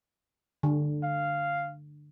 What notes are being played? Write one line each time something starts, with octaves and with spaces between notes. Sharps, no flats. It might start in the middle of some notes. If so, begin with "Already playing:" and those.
D3
F5